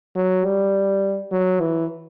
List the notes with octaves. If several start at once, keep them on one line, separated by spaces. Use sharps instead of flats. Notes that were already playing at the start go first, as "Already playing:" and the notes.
F#3
G3
F#3
E3